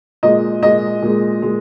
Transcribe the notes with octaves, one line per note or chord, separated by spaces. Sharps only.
A#2 G#3 D#5
A#2 G#3 D#5
A#2 G#3
A#2 G#3